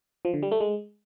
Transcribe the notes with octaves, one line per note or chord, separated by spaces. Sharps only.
F3
D3
G3
A3
G#3